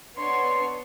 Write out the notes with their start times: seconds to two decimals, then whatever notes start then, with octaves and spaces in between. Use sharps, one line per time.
0.17 B3 D4 C#5 C6